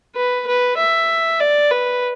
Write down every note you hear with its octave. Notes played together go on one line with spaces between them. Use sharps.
B4
B4
E5
D5
B4